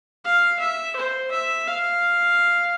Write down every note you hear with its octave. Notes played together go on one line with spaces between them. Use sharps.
F5
E5
C5
E5
F5